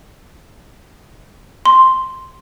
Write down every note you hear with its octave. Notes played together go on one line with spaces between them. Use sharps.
C6